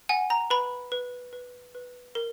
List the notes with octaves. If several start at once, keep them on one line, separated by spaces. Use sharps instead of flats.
F#5 G#5
A#5
B4 B5
B4
B4
B4
A#4